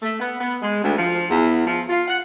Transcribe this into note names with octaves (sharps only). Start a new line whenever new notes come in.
A3
B3
B3
G#3
D2
F3
E2
F3
F4
F#5